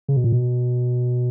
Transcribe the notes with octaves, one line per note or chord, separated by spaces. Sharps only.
C#3
B2
A#2
B2